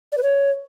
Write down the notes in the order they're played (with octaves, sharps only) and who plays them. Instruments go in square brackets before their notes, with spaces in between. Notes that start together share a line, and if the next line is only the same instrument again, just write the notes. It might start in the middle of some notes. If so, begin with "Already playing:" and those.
[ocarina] D5
B4
C#5